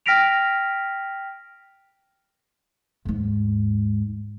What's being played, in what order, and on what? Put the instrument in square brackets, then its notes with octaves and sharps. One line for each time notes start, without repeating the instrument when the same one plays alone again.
[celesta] G5 F6 A#6 B6 D7 F7
[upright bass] D#2 G#2